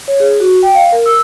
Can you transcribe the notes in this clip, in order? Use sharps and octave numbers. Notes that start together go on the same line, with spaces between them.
C#5
G#4
F#4
G5
F5
A#4
E6